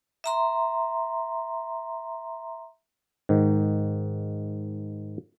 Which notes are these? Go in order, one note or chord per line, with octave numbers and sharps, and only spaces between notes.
E5 A#5 C6
G#2 D#3